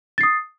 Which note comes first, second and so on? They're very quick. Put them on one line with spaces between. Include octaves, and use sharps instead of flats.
A6 C7 D#6